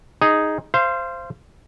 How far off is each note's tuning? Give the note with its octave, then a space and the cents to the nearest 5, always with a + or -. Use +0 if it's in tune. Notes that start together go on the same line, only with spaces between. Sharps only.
D#4 +0 G#4 +0
C5 +0 F5 -30